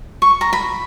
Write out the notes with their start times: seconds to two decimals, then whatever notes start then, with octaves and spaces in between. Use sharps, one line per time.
0.22 C#6
0.41 A#5
0.53 B5